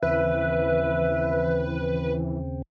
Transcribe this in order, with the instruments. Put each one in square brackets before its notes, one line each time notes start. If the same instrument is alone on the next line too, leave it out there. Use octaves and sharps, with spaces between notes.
[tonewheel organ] D#2 C#3 C4 [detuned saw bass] E3 [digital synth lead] B4 [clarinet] E5